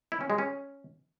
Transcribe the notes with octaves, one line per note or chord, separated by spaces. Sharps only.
E4
C#4
G#3
C#4